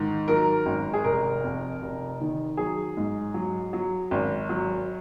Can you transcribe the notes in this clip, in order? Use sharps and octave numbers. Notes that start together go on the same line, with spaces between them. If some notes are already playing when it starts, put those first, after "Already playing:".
Already playing: G#2 D#3
F#3 A#4
G#1
G#4
F1 A#4
F2
F1
D#3
F#3 G#4
G#2
F#3
F#3
G#1
F#3